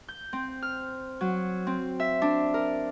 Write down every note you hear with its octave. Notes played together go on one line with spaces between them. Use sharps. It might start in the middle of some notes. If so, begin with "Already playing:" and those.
G6
C4
F6
F#3
C4
E5
D4
A#4